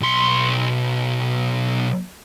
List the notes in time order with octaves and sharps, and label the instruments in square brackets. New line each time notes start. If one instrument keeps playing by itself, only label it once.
[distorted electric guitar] B1 C6